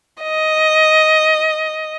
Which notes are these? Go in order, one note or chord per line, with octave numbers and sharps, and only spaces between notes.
D#5